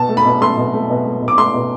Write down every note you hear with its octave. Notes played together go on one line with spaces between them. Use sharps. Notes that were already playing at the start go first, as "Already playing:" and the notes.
Already playing: B2 A5
A3
B5
B2
A3 C6
B2
A3
B2
A3
B2
D6
A3 C6
B2